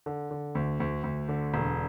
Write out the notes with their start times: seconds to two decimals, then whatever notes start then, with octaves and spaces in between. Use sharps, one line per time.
0.06 D3
0.31 D3
0.55 D2
0.80 D2
1.04 D2
1.29 D3
1.54 E1